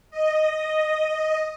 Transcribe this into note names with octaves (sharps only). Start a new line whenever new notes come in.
D#5